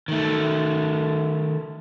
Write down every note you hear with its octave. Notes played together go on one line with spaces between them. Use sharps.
D#3 A3